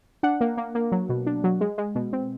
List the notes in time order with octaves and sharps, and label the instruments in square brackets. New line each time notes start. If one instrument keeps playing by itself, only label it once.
[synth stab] D4 F#5
A#3
A#3
A#3
F#3
B2
D4
F#3
G#3
G#3
B2
C4